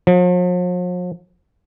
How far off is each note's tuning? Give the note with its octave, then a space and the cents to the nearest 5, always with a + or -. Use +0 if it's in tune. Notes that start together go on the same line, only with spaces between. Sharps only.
F3 +45